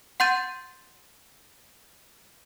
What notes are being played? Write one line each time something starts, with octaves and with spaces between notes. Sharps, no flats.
F#5 C6 G6 A6 D#7